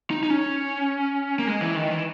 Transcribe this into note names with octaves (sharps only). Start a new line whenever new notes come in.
D#4
D#4
C#4
A#3
G#3
E3
D#3
E3